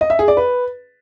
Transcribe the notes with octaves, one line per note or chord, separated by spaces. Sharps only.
D#5
E5
G#4
D5
B4